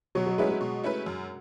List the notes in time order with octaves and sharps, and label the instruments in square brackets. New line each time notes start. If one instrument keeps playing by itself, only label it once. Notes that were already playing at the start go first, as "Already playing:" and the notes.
[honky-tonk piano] B2 [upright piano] F#3
[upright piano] F#3
[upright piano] G#3 [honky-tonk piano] A3 C#4 E4 B4
[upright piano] G#3
[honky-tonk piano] B2
A3 C#4 E4 B4
F#2